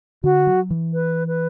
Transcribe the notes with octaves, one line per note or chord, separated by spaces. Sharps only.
D3 F#4
F#3
E3
B4
B4